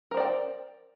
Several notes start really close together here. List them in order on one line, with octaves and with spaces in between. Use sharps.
A#4 C5 D5 G5